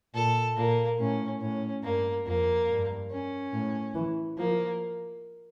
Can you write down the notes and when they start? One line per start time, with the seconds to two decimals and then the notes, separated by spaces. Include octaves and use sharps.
0.14 A#2 A4
0.57 A#2 A#3
0.99 A2 C#4
1.41 A2 C#4
1.84 G2 A#3
2.26 F2 A#3
2.68 G2
3.10 C#4
3.53 A2
3.95 E3
4.37 F3 A#3